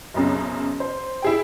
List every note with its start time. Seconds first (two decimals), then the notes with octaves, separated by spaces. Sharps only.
0.14 F#1 B1 F#2 C#3
0.80 C5
1.22 E4 G#4 G5